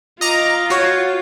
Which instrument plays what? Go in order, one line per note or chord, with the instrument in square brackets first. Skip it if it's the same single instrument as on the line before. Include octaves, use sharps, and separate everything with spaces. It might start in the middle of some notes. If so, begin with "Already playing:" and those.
[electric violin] F4 [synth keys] D#5 A#5 D6
[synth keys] F#4 C#5